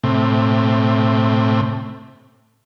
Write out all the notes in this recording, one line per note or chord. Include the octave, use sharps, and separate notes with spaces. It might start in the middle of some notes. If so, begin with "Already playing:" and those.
A2 C3